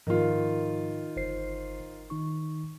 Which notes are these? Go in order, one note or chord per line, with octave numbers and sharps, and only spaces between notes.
G#2 D#3 F3 F4
G1 C5 C7
D#3 D#4 C#6